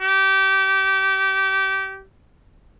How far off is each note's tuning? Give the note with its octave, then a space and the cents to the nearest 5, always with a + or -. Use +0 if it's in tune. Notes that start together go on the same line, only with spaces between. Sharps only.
G4 -25